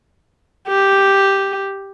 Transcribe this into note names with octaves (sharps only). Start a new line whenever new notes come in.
G4